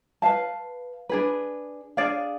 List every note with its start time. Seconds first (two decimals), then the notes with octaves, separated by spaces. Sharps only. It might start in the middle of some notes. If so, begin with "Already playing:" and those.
0.22 B4 F5 A5
1.09 D4 G#4 B4
1.97 D4 G#4 D5 F5